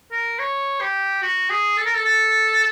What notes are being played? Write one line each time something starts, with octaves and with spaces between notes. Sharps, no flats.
A#4
C#5
G4
F#4
G#4
A4
A#4
A4
A4